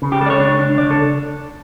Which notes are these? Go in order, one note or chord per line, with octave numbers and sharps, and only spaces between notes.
C#3
G4
C#2 A4
D5
C#5
D4
D4
C#3 D5
A4